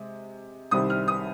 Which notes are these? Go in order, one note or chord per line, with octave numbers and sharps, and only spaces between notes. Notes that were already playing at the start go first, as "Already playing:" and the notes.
Already playing: C3 G#3
C2 C3 D#3 G3 C4 D#6
F6
D#6